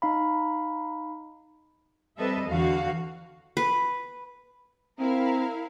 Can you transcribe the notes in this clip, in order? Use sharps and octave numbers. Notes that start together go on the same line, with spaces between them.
D#4 F5 B5
G3 C4 A4 B4 D#5 E5
E2 D3 E3 F#4 F5
B4
C4 E4 A#4 F5